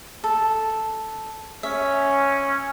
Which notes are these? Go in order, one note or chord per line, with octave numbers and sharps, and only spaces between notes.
A4
C#4 E5